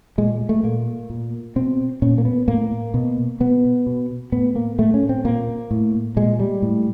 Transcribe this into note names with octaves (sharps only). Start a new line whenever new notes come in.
A#2 G#3
A3
A#2 A#3
A#2
B2 C4
A#2 C#4
A#3
B3
A2 A#3
B2
B2 B3
B2
A2 B3
A#3
A2 A3
C#4
C4
A#2 A#3
A2
A#2 G#3
G3
A2